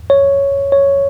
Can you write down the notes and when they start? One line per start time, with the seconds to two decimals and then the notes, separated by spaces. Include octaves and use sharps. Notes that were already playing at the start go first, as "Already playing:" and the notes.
0.10 C#5
0.72 C#5